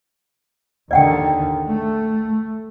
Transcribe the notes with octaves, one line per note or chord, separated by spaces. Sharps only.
D#2 D3 D#3 D5 F#5 G5
A3